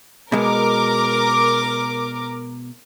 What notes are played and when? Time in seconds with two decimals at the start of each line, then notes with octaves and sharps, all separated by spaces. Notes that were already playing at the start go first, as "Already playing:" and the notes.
0.32 B2 G#3 A#4 D6